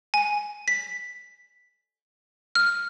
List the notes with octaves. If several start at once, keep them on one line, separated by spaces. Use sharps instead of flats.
G#5
B6
F6